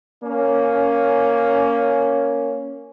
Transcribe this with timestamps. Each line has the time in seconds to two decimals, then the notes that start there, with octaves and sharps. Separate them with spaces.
0.23 A#3 C#4